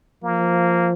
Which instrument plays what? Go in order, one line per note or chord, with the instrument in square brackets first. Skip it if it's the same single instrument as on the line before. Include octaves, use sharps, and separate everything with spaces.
[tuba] F3 [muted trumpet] A#3